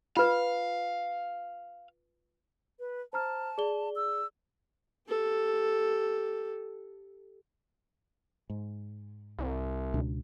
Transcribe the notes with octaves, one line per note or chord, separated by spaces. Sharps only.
F4 B4 F5
B4
C5 A5 A#5 F6
G#4 D5 G7
E6
G4 A4
G#2
C2
C#2 B2 D4